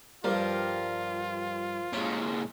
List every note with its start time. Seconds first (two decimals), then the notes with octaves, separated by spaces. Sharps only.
0.24 G2 F3 G3 F4 A#4
1.93 A#2 G#3 C#4